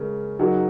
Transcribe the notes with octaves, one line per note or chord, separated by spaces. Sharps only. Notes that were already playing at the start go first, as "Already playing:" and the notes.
Already playing: C#3 G#3 C#4 A#4
C#3 F#3 D#4 F#4 A#4